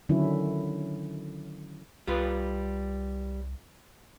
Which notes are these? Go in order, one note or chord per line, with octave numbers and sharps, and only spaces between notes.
D3 D#3 F#3 C#4 E4
C2 G3 F4 B4